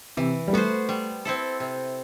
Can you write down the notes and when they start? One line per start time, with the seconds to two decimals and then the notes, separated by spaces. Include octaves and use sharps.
0.17 C3 E3
0.48 G3
0.53 A3 B3 F#4 C5
0.89 G3
1.25 C4 E4 A4
1.60 C3